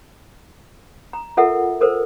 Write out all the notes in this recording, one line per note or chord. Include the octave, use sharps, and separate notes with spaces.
A#5
F4 A4 A#4 E5 F#5
A4 A#4 C5